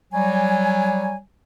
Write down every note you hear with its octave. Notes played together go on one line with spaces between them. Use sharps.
F#3 G3 G#5